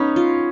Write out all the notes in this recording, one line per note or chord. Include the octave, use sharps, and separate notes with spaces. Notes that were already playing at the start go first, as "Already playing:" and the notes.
Already playing: B3 C#4 D#4
F4